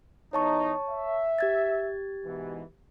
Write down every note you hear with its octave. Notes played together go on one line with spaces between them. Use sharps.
E2 D#4 C#5 A5 C#6
E5
G4 G#6 A6
G#2 B2 E3